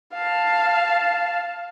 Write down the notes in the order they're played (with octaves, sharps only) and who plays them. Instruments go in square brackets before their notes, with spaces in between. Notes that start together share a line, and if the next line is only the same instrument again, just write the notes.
[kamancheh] F5 A5